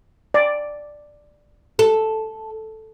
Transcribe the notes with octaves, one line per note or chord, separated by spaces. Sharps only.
D5
A4